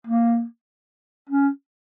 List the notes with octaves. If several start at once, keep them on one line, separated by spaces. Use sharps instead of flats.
A#3
C#4